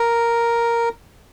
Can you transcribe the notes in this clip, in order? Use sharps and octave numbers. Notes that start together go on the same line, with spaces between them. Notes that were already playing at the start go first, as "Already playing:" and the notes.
Already playing: A#4